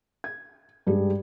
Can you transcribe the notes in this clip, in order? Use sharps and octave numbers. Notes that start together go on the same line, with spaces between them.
G#6
G2 G#3 G4 G#4